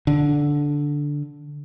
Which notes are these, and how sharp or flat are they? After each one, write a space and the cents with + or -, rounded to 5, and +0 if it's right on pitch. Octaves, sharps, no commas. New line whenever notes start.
D3 -5